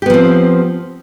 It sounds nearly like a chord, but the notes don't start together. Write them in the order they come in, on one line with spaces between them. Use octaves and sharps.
G4 B3 F3 C4